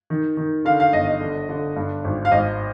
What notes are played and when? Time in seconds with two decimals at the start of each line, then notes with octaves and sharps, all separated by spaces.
0.10 D#3
0.37 D#3
0.65 D3 F5
0.80 F5
0.93 G1 D#5
1.07 D#5
1.20 D3
1.49 D3
1.76 G2
2.04 G#1
2.25 F5
2.31 G#1 D#5